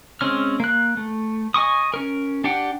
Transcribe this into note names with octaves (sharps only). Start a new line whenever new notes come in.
G#3 C4 C#4 F6
A#3 F#6
A3
D#5 G#5 C#6 D#6
C#4 A#4
D4 G4 D5 F#5 G5